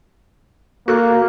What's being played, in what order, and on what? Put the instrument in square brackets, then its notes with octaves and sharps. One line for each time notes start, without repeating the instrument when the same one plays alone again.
[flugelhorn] A#3 [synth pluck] F#4 A4 F#6